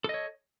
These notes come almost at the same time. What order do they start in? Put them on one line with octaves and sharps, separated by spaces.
A4 D#5 C#5